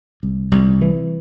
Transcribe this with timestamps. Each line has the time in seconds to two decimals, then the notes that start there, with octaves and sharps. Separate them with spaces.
0.23 C2
0.51 C2
0.81 E3